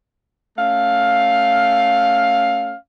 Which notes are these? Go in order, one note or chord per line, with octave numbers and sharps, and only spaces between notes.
A3 C#4 F5